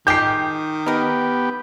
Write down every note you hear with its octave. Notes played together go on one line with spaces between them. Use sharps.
D#3 G#3 G4 G6 C7
B3 D#4 G4 A#4